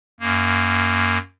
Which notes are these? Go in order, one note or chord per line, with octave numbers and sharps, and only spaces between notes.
F#2 A#3